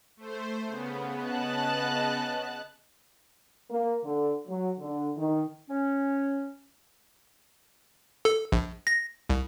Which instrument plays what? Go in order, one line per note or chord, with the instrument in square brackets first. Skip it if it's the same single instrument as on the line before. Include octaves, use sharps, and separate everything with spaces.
[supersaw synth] A3 C5
C#3 B3
[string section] D#5 A5 F#6
[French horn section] A#3
D3
F#3
D3
D#3
[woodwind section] C#4
[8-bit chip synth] A4
A#1
A#6
C2